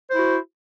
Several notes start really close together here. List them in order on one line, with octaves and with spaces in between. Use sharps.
C5 E4 F#4